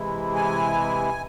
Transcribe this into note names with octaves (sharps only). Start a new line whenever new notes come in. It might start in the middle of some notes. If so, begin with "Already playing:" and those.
Already playing: C3 E3 G#3 E4
G#5